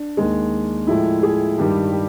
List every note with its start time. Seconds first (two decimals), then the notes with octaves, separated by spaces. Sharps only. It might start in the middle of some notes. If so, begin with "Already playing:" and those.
Already playing: D4
0.17 D#2 D#3 G#3
0.87 A2 F3 G#3 E4
1.23 G#4
1.58 G2 D#3 G3 G4
1.92 G4